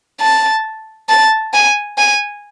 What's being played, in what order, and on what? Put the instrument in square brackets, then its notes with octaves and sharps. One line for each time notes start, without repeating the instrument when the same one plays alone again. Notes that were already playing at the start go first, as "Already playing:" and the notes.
[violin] A5
A5
G#5
G#5